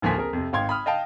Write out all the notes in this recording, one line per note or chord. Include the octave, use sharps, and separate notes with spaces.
A1 D2 F3 A#3 G#5 B6
C4 G#4 A#4
F2 C3
G#1 F5 G5 C6 G#6
B5 D#6 F6
D#5 F5 G5 A5